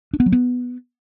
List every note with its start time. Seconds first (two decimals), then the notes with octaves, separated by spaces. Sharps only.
0.13 D4
0.20 B3
0.26 F#3
0.32 B3